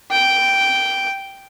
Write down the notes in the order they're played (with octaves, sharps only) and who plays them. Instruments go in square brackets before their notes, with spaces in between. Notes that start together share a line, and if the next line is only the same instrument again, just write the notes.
[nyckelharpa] G5